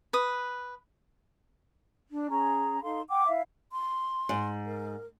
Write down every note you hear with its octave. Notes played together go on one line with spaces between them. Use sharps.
B4 D#6
D4
C#4 G#4 A#5
D#4 A4 F5 C6
F#5 G5 D6
E4 E5 F5
C6
G#2
A#4